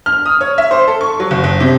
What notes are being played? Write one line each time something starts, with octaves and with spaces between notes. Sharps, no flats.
F6
D#6
C#5
E5
C5
A4
C#6
F#3
F#1
F#1
C3